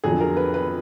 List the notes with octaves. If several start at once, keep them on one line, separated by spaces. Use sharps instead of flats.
F2 D3 F#3 G#4
A#4
B4
B4